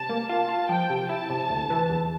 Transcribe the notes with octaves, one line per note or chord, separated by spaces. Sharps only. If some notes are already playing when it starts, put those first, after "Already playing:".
Already playing: C3 A5
A#3
F4 A5
F4
F3 G5
C3
E4 A5
C3
D2
E3
E2